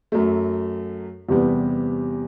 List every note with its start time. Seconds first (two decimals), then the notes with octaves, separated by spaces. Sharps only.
0.12 F#2 F#3 A3
1.29 E2 C3 G3 B3